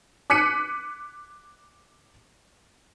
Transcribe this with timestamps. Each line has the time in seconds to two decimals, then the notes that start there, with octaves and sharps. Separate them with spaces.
0.30 D6 F#6 B6 C#7 D#7